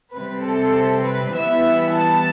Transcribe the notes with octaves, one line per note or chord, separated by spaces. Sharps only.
C3 G3 C4 B4
A4
B4
E3 G3 B3 E4 E5
A5